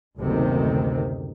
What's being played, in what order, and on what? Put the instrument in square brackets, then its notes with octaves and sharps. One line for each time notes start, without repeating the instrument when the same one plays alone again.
[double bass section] F#1 D2 C3 D#3